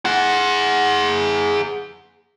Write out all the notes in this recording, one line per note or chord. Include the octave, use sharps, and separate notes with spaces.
G#4 F#5